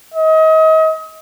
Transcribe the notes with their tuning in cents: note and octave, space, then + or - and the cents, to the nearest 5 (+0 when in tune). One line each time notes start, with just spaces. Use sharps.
D#5 +35